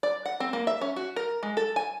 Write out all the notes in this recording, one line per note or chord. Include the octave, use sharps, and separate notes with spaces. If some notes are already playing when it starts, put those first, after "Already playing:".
D5
F#5
C4
A#3
E5
C#4
F#4
A#4
G#3
A4
G#5